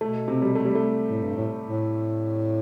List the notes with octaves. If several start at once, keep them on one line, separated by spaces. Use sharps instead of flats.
B2 A3
C3
G3
A3
G3
A3
A2
G2
A2
A2